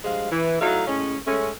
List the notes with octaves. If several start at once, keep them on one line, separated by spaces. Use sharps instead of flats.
G2 F3 G#3 F5
E3
F#3 A3 D#4 E4 F5
A2 G#3 C#4
G#3 A3 C#4